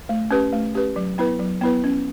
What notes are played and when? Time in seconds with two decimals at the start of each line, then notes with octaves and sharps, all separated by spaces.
0.09 A3
0.31 C#4 G4 B4
0.53 A3
0.75 C#4 G4 B4
0.96 F#3
1.18 B3 E4 B4
1.39 F#3
1.61 B3 E4 B4
1.84 C#4